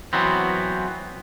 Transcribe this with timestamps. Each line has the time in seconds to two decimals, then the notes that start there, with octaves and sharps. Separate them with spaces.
0.13 E3 F#3 B3 C4